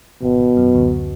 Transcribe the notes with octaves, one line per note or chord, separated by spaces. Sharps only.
G#1 B2
G#1
F#2
D2